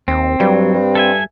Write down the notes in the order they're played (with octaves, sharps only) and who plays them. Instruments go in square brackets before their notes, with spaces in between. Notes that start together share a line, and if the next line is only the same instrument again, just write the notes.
[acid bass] D#2 [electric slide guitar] C4
[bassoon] G2 [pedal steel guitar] F#3 [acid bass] G3
[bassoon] G2
[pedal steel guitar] A4 E5 G#5